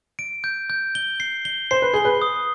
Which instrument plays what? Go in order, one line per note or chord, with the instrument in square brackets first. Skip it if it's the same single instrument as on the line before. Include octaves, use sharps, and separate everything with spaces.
[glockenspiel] D7
G6
G6
G7
C7
G7
[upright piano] C5 [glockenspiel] C7
[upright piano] B4
[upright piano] G#4 [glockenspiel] G7
[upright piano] B4
[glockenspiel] D#6